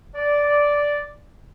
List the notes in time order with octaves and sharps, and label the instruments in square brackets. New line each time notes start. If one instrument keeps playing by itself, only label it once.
[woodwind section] D5